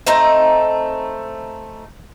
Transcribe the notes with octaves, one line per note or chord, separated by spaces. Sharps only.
A3 C4 D#4 A#5